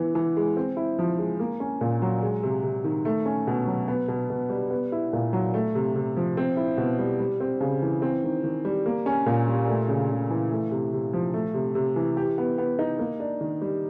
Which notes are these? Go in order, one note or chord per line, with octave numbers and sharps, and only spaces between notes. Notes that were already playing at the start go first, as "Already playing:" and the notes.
Already playing: E3 B3
E3
G#3
C4
E4
F3
G#3
A#3
C#4
A#2
F#3
G#3
C3
C3
D#3
A3
C#4
B2
F#3
B3
B2
B2
G3
B3
E4
A#2
F#3
A3
C3
C3
F3
C4
E4
B2
G3
G3
C4
C#3
E3
C4
D#3
D#3
G3
A#3
C#4
A#2
G3
A3
C#3
C#3
E3
A3
C3
C3
F3
A3
C3
C3
E3
G4
B3
B3
D#4
A#3
D4
D#3
G3